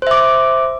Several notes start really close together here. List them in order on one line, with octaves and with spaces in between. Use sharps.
C5 E5 D6